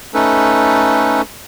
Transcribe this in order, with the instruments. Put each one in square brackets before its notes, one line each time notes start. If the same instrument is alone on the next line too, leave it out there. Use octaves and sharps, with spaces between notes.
[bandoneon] A3 C#4 D#4 A4 B4